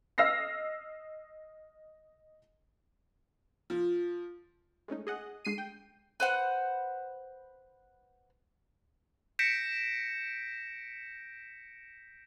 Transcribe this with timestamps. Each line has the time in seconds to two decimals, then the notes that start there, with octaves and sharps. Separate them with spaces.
0.18 D#5 E6 F6 A#6 C7
3.70 F3
4.88 G#3 A3 C#4 D#4
5.07 G#4 D#5 F#5
5.45 D3 G#3 C7 D#7
5.58 G5
6.20 B4 C5 F#5
9.39 G6 A#6 B6 C#7 D7 E7